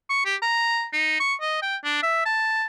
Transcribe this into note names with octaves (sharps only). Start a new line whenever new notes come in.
C#6
G4
A#5
D#4
C#6
D#5
G5
D4
E5
A5